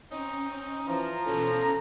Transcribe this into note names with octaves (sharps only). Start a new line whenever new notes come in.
C4 C#4 D#4
E3 F3 A#5
B2 E3 C#4 A4